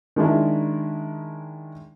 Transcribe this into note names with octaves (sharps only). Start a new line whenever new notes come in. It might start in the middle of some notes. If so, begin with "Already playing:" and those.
D#3 G#3 D4 E4